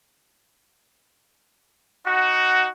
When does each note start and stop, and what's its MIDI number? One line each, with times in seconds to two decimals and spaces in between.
2.06 2.69 63
2.06 2.69 66